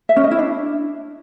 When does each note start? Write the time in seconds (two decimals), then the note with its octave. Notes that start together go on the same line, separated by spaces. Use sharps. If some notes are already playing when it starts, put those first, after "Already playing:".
0.09 E5
0.17 C#4
0.24 D#5
0.31 E4
0.39 D4